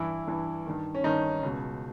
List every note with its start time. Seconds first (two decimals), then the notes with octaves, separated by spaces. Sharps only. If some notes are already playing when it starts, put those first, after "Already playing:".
Already playing: G2 E3 E4
0.27 G2 E3
0.66 G2 D#3
0.95 C#4
1.04 G2 D#3 D#4
1.43 C#2 B2